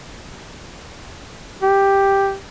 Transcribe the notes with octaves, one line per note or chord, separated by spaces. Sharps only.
G4